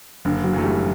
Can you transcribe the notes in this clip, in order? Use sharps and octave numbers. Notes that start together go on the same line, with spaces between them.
F#1 D3
F#3
F#2 E3 A3
G3